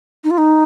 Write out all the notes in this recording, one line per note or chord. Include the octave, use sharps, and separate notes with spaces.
D#4
F4
D#4